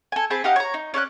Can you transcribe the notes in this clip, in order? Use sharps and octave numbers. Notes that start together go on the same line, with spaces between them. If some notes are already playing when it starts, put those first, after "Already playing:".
A4 G#5
C4 G#4 A5 B5
D#4 G4 F5 F#5
C#5 A#5
D#4
C#4 D5 A5 F#6